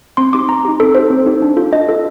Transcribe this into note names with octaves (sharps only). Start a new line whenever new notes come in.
C4 C6
D#4 G4 D6
C4 A#5
D#4 G4
C4 A4
D#4 G4 C5
C4
D#4 G4
D4
F4 A4
D4 D#5
F4 A4